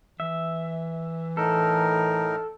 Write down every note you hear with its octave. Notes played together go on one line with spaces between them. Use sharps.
E3 E5
A2 D#4 A4 A#4